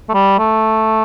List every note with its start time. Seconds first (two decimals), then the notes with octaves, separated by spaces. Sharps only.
0.09 A3
0.14 G3
0.39 A3